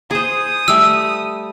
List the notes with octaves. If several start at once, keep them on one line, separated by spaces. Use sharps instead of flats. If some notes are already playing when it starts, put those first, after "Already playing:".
G#4 C5 D#6
G3 A3 E6